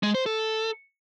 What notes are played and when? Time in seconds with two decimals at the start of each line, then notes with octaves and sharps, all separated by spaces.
0.03 G#3
0.15 C5
0.26 A4